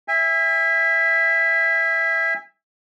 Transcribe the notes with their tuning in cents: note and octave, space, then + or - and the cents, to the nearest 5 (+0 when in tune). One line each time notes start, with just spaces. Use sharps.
E5 +0 G#5 -35